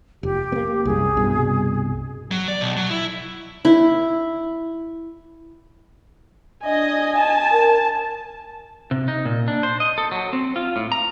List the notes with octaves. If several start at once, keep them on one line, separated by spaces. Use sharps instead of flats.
F1 G4
A#3 B3
C2 F#2 G#4
C2 G2 B2
F#3
D5
B1
F#3
E4
E4
D4 D#5 G#5
A5
A#4
C3
D#4
A#2
D4
C5
D#5
A4
F#3
C4
F4
A2
A#5